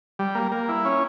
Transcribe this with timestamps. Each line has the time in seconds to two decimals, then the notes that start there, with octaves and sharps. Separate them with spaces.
0.19 G3
0.35 A#3
0.52 A#3
0.69 E4
0.85 C#4